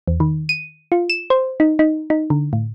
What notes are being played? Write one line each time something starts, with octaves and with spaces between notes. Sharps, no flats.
E2
D#3
D#7
F4
E7
C5
D#4
D#4
D#4
D3
A2